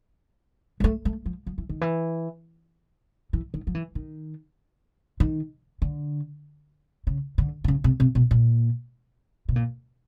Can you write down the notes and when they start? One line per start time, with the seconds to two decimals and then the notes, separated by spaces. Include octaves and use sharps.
0.80 G#3
0.84 A3
1.05 A3
1.26 F3
1.47 F3
1.58 E3
1.69 D#3
1.81 E3
3.33 E3
3.54 D#3
3.67 F3
3.75 E3
3.95 D#3
5.20 D#3
5.82 D3
7.07 C#3
7.38 D3
7.64 C3
7.68 C#3
7.84 C3
8.00 C3
8.15 B2
8.31 A#2
9.49 B2
9.56 A#2